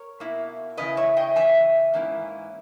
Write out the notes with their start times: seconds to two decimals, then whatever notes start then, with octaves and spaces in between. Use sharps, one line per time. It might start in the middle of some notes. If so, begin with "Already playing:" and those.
Already playing: A#4 C#5
0.20 B2 A#3 E4
0.77 C#3 E3 E4 B4 D#5
0.97 C#5 E5
1.17 D#5 G5
1.36 C#3 E3 E5 G#5
1.93 G#2 E3 A#3 C#4 E4